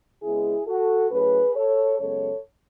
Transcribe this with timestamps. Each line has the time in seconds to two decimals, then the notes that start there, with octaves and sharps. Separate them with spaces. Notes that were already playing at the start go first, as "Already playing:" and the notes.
0.23 C#3 G#3 B3 E4 G#4
0.67 F#4 A4
1.11 A2 F#3 C#4 G#4 B4
1.56 A4 C#5
1.99 F#2 C#3 G#3 B3 A4 C#5